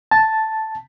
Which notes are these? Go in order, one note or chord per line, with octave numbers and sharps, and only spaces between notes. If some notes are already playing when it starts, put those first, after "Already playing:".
A5